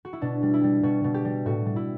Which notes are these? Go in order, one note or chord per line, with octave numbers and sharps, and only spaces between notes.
F#4
E4
B2 D4
G3
E4
G3
B2 F#4
B2
G4
G3
A2 F#4
G3
E4